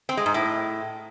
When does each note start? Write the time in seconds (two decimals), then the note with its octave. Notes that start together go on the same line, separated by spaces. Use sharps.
0.09 C4
0.17 G#3
0.26 G#2
0.34 A2